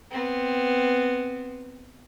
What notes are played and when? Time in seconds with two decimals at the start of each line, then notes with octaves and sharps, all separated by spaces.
0.11 B3 C4